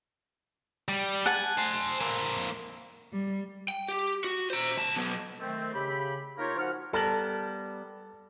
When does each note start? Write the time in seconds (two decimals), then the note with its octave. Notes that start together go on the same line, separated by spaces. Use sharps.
0.89 G3
1.26 F#5 G#5 A5
1.58 C5 G#5
2.01 A#3 C4
3.13 G3
3.68 G5
3.88 G4
4.24 F#4
4.50 C5 A#5
4.77 C#2 A5
4.96 F#3 B3
5.40 D#3 A3 C4
5.74 C#3 G4 B5
6.38 A#3 D#4 F4 G4 A#4 C#5
6.57 F3 F#4 F#5 F6
6.93 G3 B3 A4 A#4 A5 F#7